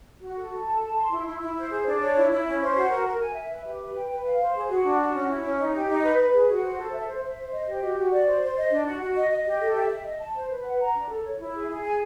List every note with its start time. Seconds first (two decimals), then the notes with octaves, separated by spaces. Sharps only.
0.21 F#4
0.36 A4
0.52 A4
0.66 A5
0.82 A5
0.96 C6
1.12 E4
1.26 E4
1.41 E4
1.57 C5
1.71 G#4
1.86 D4
2.00 C#5
2.15 E4
2.30 E4
2.46 C#4
2.61 C5
2.76 F#4
2.89 A#4
3.05 A#4
3.20 G#5
3.34 E5
3.49 B4
3.64 G4
3.80 B4
3.95 G5
4.09 B4
4.23 F5
4.40 C5
4.54 G#4
4.69 F#4
4.84 D4
4.98 F#4
5.13 C#4
5.29 E4
5.43 C#4
5.58 D#4
5.74 G4
5.88 D#4
6.02 B4
6.17 B4
6.32 G#4
6.48 F#4
6.63 C5
6.77 A4
6.92 E5
7.07 C5
7.22 E5
7.37 C5
7.52 D#5
7.66 G4
7.81 F#4
7.96 F#4
8.11 D5
8.26 C5
8.42 C5
8.56 D#5
8.70 D4
8.85 F#4
9.01 F#4
9.15 D#5
9.30 D#5
9.46 G4
9.60 A4
9.75 E5
9.90 E5
10.05 D#5
10.20 A5
10.35 C5
10.50 B4
10.64 F#5
10.80 A#5
10.94 D4
11.09 A4
11.24 C#5
11.38 E4
11.54 G#4
11.69 G#4
11.83 G#5